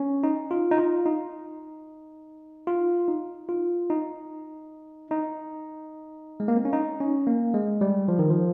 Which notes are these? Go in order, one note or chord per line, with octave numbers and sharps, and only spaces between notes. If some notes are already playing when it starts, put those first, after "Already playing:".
Already playing: C#4
D#4
F4
D#4
F4
D#4
F4
D#4
F4
D#4
D#4
G#3
A#3
C4
C#4
D#4
C#4
A#3
G#3
G3
F3
D#3
F3